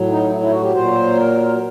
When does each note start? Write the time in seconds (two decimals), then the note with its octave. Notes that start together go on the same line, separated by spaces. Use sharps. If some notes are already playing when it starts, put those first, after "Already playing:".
Already playing: A2 F#3
0.09 D#4
0.30 E4
0.40 E4
0.51 F#4
0.61 G4
0.72 A#2 F#3 C5
1.15 A#4